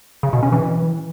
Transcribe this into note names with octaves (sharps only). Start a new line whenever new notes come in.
C#3
B2
C#4
E3